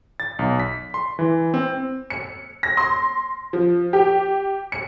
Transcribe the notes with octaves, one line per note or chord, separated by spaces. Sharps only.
A6
B1
B6
C6
E3
C4
C#7
A#6
C6
F3
G4
C#7